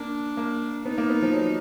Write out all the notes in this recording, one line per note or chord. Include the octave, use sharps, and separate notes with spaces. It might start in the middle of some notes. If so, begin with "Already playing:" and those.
Already playing: A#3 D4
A#3
B3 D#4
A#3
B3
F3
F#3